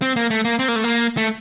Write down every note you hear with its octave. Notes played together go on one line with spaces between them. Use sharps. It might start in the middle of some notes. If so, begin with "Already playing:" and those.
C4
A#3
A3
A#3
C4
A#3
A3
A#3
A3